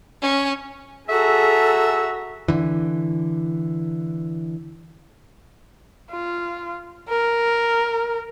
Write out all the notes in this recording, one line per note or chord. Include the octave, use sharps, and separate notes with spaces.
C#4
F#4 G#4 A4 E5 A#5
D3 E3
F4
A#4